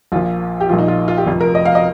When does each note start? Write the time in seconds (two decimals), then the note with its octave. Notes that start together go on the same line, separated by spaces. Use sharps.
0.12 A#1 A#2 F3 F4
0.61 G4
0.69 A#1 A#2 F3 F4
0.78 D#4
0.88 F4
1.08 F4
1.18 G4
1.26 F1 F2 F3
1.41 A#4
1.55 D#5
1.65 F5
1.75 D#5